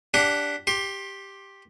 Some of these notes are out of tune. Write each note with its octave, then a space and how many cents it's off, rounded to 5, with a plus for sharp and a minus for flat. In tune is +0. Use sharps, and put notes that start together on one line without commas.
D4 -10 G4 +10 F#5 +0
G4 +0 C6 +30